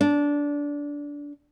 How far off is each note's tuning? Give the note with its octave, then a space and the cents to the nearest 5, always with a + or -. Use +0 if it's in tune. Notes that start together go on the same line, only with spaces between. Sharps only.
D4 -15